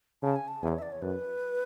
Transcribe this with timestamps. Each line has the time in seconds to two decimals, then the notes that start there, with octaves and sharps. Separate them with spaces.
0.23 C#3 A5
0.36 G#5
0.48 A5
0.63 E2 G#5
0.68 B4
0.72 C#5
0.78 E5
0.82 D5
0.92 C#5
1.02 F#2 B4